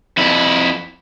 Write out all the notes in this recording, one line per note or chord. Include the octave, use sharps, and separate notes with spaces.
F2 E4